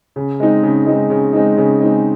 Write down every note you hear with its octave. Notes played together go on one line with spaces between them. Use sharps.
C#3
G#3 C4 D#4
C#3
G#3 C4 D#4
C#3
G#3 C4 D#4
C#3
G#3 C4 D#4